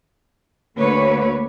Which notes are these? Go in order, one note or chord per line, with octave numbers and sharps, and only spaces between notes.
D2 D3 A#3 B4 C#5